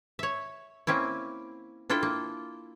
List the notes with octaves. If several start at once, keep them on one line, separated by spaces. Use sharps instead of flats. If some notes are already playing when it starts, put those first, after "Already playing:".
C#5 E5
A#3 C4 C#4 E4
D4 E4 F4 A4 G5
A#3